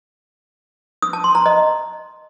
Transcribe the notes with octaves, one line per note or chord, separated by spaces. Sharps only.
D#6
A5
C6
A#5
D#5